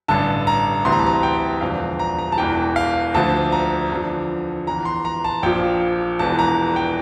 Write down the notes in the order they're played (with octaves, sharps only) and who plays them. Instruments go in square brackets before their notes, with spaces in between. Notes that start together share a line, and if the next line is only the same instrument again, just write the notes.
[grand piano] A1 G2 D3 A5
A#5
D2 C3 E3 C6
A#5
A5
A#5
G5
E1 E2 D3 F3 F5
A#5
A#5
A5
E1 E2 E3 G5
F5
D2 D3 F3 A5
A#5
E2 D3 F3
E2 E3 A#5
C6
A#5
A5
A#1 A#2 F3 G5
E1 E2 E3 A5
A#5
G5